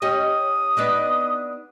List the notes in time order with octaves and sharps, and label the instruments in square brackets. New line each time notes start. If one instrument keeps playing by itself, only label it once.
[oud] C#4 G4 D#5 [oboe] D#6
[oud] B3 D4 D#4